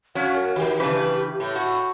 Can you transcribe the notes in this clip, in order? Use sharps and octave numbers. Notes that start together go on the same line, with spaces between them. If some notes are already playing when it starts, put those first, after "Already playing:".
F#3 C#4 F5
A#4
D#3 G4
C#3 E3 D4 B4
A2
F#4